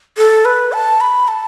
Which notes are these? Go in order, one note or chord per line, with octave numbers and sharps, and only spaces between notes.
A4
B4
A5
B5
A5